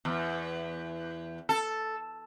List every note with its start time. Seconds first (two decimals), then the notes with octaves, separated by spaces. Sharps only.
0.05 E2
1.49 A4